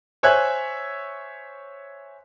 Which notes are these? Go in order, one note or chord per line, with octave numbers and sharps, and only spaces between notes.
C5 C#5 E5 G#5 F#6 G#6